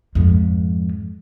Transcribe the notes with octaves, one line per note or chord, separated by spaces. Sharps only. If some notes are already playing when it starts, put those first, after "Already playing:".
F2 G#2